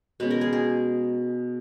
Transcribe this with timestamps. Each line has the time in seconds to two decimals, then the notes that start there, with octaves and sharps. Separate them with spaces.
0.20 B2 G#3 C#4 B4
0.31 A#4
0.41 G#4
0.53 G#4